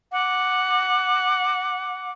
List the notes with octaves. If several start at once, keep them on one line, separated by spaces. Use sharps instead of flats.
F#5 D6